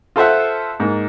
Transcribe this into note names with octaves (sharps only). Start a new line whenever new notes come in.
F4 A4 C5 E5 F#5
G#2 A#3